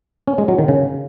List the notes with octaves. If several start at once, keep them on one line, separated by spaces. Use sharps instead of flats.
C#4
G#3
F#3
D#3
C#3